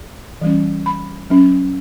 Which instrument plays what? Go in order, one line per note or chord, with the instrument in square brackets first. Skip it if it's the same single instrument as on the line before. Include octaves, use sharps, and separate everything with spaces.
[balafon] E3 G3 C#4
B5
F#3 C#4